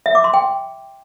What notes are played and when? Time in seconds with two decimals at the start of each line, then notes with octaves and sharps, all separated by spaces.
0.06 E5
0.15 D6
0.24 C6
0.34 G5